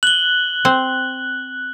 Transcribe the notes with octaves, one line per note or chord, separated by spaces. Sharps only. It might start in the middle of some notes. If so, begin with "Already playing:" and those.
F#6 F#7 G7
C4